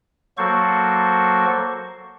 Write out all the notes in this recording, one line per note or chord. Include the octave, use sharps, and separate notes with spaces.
F#3 A#3 F#4 A4 C5 C#6